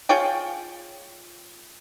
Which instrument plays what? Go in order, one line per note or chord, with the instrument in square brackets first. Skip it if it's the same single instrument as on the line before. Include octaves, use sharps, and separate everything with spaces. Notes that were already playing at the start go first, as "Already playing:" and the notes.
[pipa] F4 G#4 C#5 G5